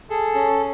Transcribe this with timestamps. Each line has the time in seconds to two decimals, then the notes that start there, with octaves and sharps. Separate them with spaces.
0.10 G#4 A4
0.35 C#4